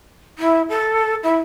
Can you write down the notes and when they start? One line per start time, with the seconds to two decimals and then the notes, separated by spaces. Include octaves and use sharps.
0.38 E4
0.69 A4
1.23 E4